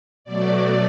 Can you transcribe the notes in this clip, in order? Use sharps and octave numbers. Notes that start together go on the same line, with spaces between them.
B2 F#3 A3 D5